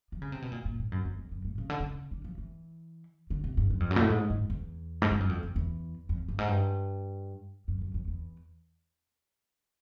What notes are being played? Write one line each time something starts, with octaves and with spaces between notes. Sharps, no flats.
F3
C#3
C3
B2
A#2
A#2
G#2
F#2
F2
F2
F#2
A2
C#3
D3
C#3
D3
F3
E3
D3
C3
G2
F#2
F2
F#2
A#2
A2
G#2
G#2
E2
G#2
G2
F#2
F2
F2
E2
F2
G2
G#2
G2
F#2
F#2
F2
E2